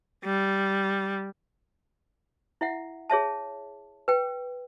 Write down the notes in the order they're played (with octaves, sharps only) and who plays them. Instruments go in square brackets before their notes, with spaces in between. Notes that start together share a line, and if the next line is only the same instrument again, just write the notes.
[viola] G3
[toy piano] E4 E5 F#5
G#4 C#5 E5 A5
B4 G5